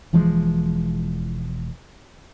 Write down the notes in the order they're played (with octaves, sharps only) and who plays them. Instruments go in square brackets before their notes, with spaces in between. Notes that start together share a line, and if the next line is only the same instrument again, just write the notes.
[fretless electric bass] E1 E3 F3 G#3